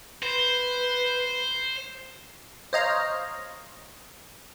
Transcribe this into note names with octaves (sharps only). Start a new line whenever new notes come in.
B4 C5
C5 C#5 D#5 F5 A#5